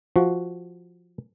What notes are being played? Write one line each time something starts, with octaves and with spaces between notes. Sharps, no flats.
F3 F#4